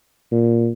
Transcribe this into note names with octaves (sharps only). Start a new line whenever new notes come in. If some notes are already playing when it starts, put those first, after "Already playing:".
A#2